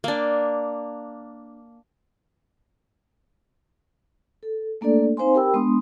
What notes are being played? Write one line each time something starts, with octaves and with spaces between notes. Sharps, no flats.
A#3 D4
A4
A3 A#3 D4 A4 D5
C4 D#4 C5 F5 G#5 C6
G4 A#4 G5 B5 E6
G#3 B3 D4 C6 D#6